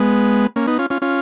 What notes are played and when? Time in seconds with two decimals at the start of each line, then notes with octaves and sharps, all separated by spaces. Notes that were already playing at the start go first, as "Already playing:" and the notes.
Already playing: G#3 B3
0.56 A#3 C#4
0.67 B3 D#4
0.79 C#4 F4
0.90 C#4 F4
1.02 C#4 F4